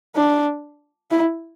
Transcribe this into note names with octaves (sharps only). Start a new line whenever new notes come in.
D4
E4